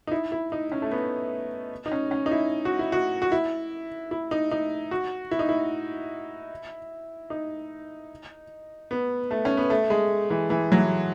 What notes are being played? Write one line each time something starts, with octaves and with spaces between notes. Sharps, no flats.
D#4
E4
E4
D#4
C#4
A3
B3
D#4
C#4
C#4
D#4
E4
F#4
E4
F#4
F#4
E4
E4
D#4
D#4
F#4
E4
D#4
E4
D#4
B3
A3
C#4
B3
A3
G#3
E3
E3
F#3
E3